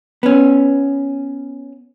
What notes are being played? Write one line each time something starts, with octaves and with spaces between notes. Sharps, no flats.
B3 C#4